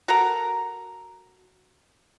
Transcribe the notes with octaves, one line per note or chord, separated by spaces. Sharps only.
F#4 A4 A#4 A#5